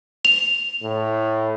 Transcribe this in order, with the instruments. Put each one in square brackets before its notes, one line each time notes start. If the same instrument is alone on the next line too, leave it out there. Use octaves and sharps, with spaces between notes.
[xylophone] F7
[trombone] A2